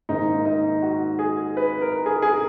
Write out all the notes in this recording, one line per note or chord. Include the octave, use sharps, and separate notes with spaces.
G#2 D#3 A#3 D#4
D#4
F#4
G#4
B4
A#4
G#4
G#4
A#4